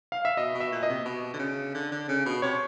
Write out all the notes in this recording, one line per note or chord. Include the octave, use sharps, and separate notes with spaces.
F5
E5
B2 D#5
B2
E5
A#2
D#5
C3
B2
D3
C#3
D3
D3
C#3
B2
C3 C#5